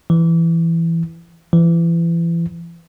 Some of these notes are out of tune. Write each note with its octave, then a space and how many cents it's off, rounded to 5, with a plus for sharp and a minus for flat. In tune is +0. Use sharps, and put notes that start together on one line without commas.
E3 +10
E3 +30